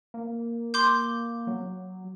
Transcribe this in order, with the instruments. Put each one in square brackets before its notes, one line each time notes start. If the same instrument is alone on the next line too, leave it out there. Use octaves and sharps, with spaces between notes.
[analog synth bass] A#3
[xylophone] C6 D6 G6
[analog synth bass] F#3